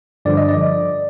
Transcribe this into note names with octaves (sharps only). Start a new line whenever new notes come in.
G2 D3 F3 D5
D#5
D5